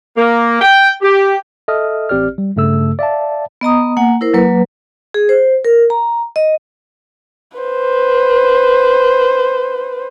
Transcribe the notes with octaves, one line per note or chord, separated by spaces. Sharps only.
A#3
G5
G4
A4 D#5 E5 D#6 F6
A1 C4 G4 D5 F6
G3
G2 C#3 A3 A4 E6
D5 E5 F5 A5
B3 D#5 A#5 D#6
A#3 F#5 G#5
E4 A#4 C5
F#3 A#3 B4
G#4
C5
A#4
A#5
D#5
B4 C5